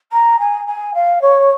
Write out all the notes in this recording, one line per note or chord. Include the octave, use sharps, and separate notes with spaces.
A#5
G#5
G#5
F5
C#5